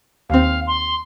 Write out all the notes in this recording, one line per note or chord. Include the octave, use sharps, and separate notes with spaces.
D#2 C4 F5
C6